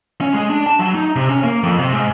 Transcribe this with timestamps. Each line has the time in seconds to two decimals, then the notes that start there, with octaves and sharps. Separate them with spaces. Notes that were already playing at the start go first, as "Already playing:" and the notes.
0.21 C#4
0.33 G#3
0.50 D4
0.67 A5
0.79 F#3
0.95 D#4
1.16 C3
1.29 C#4
1.44 A#3
1.64 F2
1.79 C3
1.93 G#2